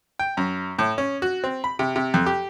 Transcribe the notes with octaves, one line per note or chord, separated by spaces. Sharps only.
G5
F#2
A2
C#4
F#4
C4
B5
C3
C3
F2
G4